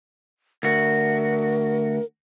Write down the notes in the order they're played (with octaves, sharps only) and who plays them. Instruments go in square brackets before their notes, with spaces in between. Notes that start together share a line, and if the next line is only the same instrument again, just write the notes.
[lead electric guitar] D2 F#4 [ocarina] A#4